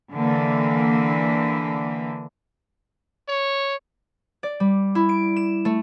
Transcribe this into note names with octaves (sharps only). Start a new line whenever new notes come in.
D3 E3 A#3
C#5
D5
G3
E4
D7
E7
A3